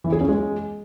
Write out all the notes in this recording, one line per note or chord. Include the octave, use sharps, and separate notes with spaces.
E3
G#4
C#4
G#3